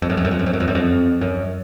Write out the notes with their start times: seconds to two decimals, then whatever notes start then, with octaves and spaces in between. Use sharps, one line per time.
0.02 F2
0.10 F#2
0.17 F2
0.25 F#2
0.31 F2
0.39 F#2
0.46 F2
0.53 F#2
0.60 F2
0.68 F#2
0.75 F2
1.21 F#2